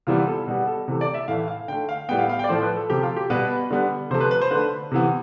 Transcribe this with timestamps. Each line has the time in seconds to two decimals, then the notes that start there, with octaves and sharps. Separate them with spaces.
0.07 C3 E3 G3 B3 F4
0.27 A4
0.47 B2 G3 B3
0.67 A4
0.88 C3 E3 A3
1.01 D5
1.14 E5
1.28 A2 E3 A3 F5
1.48 F5
1.68 D3 G5
1.73 A3
1.89 F5
2.09 A2 G3 B3 G5
2.19 F5
2.29 F5
2.39 G5
2.44 D5
2.49 A2 F3 A3 C5
2.63 B4
2.76 A4
2.90 C3 F3 A3 G4
3.03 F4
3.17 G4
3.30 B2 G3 B3 B4
3.70 D3 G3 B3
4.10 C3 F3 A3 C5
4.21 B4
4.31 B4
4.42 C5
4.51 D3 A3 B4
4.92 C3 E3 B3